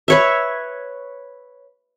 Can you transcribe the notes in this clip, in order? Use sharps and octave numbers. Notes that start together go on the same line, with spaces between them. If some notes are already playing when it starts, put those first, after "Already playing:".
B4 C#5 E5